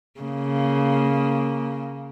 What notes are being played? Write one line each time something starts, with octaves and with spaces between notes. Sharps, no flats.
C#3 A#3